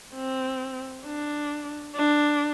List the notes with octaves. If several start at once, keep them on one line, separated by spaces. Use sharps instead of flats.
C4
D4
D4